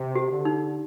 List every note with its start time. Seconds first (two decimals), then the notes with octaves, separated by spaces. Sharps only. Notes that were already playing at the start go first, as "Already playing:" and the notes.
Already playing: C3
0.15 G4
0.30 D3
0.45 D#4